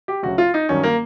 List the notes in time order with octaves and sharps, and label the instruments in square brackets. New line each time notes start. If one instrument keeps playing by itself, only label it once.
[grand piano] G4
D2 C#3 F#3 F#4
F4
D#4
G2 D#3 F#3 C#4
A#3